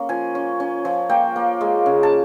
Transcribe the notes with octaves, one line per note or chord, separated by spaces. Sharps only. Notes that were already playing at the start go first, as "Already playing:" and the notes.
Already playing: A#3 C#4
F3 G#5
C#4
C#4
F3
A#3 G5
A#3
G#3
C#3
A5